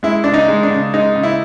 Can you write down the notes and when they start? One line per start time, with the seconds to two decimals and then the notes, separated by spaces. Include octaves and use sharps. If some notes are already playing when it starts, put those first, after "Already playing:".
0.03 G#3 E4
0.24 C#3 D4
0.34 D#4
0.48 G#3
0.63 D4
0.71 C#3
0.93 G#3 D#4
1.16 C#3
1.23 E4